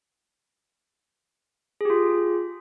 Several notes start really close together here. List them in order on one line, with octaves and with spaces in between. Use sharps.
G#4 G4 F4